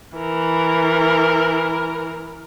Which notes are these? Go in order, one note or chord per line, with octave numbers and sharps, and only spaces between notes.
E3 A#4